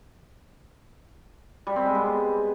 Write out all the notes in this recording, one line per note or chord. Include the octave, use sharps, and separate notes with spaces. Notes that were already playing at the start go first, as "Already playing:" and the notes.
G3
C4
G#3
B3